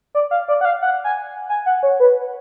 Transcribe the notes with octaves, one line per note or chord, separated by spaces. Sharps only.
D5
F5
D5
F#5
F5
F#5
G#5
G#5
F#5
C#5
B4